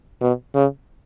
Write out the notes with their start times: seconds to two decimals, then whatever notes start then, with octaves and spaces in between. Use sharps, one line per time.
0.21 B2
0.55 C#3